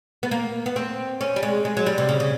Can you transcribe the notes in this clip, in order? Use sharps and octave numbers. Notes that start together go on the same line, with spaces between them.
B3
A#3
B3
C4
C#4
G3
G#3
G#3
F#3
G3
C3
C#3
C#3